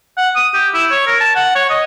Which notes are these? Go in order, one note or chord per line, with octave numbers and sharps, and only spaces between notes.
F#5
D#6
G4
E4
C#5
A#4
A5
F#5
C#5
D#5